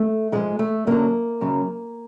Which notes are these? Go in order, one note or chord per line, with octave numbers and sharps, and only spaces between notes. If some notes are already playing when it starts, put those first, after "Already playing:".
Already playing: A3
G#2 F3 G#3
A3
F#2 D3 F#3 A#3
F#2 C#3 F#3